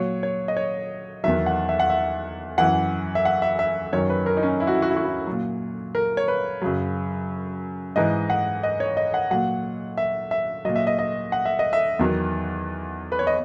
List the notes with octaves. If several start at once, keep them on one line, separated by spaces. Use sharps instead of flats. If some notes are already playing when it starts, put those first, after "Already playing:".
Already playing: A#2 F#3 C#5
C#5
D#5
C#5
E2 D#3 F#3 E5
F#5
E5
F#5
E5
F#2 E3 F#5
E5
F#5
E5
E5
F#2 D#3 F#3 C#5
B4
A#4
D#4
C#4
E4
F#4
E4
F#4
E4
F#4
E4
A#2 F#3
A#4
C#5
B4
F#2 C#3 F#3
G#2 E3 D#5
F#5
D#5
C#5
D#5
F#5
A#2 F#3 F#5
E5
E5
A#2 F#3 D#5
E5
D#5
D#5
F#5
E5
D#5
E5
E2 D#3 F#3
B4
C#5
D#5